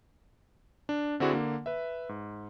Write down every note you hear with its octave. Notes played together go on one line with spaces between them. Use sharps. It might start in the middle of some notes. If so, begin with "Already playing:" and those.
D4
D3 C4 D4 E4 F#4 G#4
D3 A#3
B4 E5
G#2